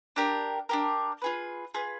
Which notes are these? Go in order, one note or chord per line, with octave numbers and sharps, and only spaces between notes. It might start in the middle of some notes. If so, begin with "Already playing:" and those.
D4 G4 A#4
D4 G4 A#4
F4 G#4 B4
F4 G#4 B4